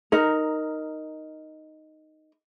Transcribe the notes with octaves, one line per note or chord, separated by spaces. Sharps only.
D#4 A#4